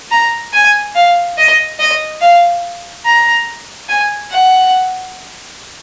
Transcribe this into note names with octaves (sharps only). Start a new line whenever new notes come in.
A#5
G#5
F5
D#5
D#5
F5
A#5
G#5
F#5